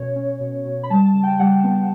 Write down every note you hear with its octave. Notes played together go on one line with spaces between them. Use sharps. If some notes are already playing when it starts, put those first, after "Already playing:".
Already playing: B2 C#4 C#5
C#4
B2
B2
B5
G3 A5
A5
C#3
G5
G3 F#5
B3